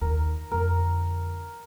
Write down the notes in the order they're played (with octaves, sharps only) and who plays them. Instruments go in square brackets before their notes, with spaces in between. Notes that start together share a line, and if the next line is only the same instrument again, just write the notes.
[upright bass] D#2 [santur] A#4
[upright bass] F2 D3 [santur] A#4